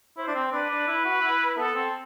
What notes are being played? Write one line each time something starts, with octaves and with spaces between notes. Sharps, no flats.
E4 C5
D4
C4
D4 B4
D4
E4
F#4
E4
B3 A4
C4